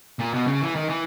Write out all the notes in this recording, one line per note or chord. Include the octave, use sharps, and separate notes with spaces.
A#2
B2
C#3
E3
D#3
E3